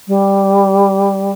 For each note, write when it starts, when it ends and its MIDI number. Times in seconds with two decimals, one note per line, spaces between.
0.07 1.31 55